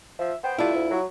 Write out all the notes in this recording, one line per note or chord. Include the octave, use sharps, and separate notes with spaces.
F3 E5
B3 C5 G5
G3 A3 D4 E4 F4
D2
F#3